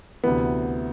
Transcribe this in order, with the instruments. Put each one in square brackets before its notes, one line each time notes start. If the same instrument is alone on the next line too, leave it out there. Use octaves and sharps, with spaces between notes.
[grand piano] D2 C3 E3 B3